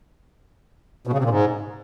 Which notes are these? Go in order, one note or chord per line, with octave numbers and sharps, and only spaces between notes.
B2
C#3
C3
A#2
G#2